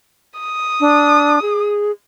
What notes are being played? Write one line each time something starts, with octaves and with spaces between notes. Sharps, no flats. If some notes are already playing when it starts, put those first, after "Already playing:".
D#6
D4
G#4